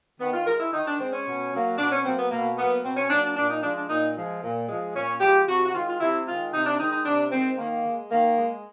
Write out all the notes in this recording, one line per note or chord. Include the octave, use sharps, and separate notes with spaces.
D#3 B3
F4
G#3 A#4
E4
D#3 D#4
D4
G#3 C4
C#4
B2
F#3 A#3
B2 D4
C#4
F#3 A#3 C4
B3
B2 A#3
F#3 A#3 B3
B2 C4
C#4
F#3 A#3 D4
D4
A#2 D4
D#4
F3 G#3 D4
D4
A#2 D#4
F3 G#3
A#2
F3 G#3
A#2 C#4
F3 G#3 G4
C3 F#4
F#4
D#3 G#3 F4
F4
C3 E4
D#3 G#3 F4
C3 D#4
D4
D#3 G#3 D#4
D#4
C3 D4
D#3 G#3 C4
D#3 A#3
G#3
D#3 A#3
G#3